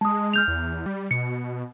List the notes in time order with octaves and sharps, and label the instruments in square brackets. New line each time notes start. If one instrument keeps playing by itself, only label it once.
[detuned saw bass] G#3 [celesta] A5 D#6
[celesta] F6 G6 F7
[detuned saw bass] E2
G3
[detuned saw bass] B2 [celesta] C#7